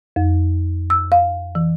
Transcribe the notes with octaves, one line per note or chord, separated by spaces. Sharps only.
F2
E6
F5
E3